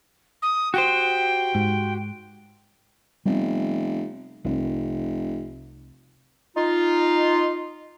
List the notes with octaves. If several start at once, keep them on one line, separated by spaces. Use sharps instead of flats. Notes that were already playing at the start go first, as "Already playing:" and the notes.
D#6
F#4 G4 C5 G5
G#2
F1 G3 B3
F1 C2
D#4 F4